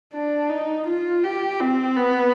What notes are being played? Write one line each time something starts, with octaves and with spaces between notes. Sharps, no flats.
D4
D#4
F4
G4
C4
B3